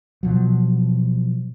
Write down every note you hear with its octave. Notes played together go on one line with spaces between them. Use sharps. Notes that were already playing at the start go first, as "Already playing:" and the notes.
B2 F3 F#3